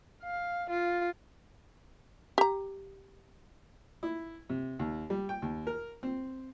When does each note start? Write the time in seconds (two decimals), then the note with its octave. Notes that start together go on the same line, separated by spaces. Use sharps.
0.23 F5
0.70 F4
2.38 G4 A#5
4.03 E4
4.49 C3
4.79 D#2
5.10 G3
5.29 G5
5.42 D#2
5.67 A#4
6.03 C4